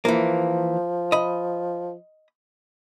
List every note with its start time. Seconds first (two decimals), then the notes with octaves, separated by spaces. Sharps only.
0.05 E3 F3 A#3
1.12 D#5 B5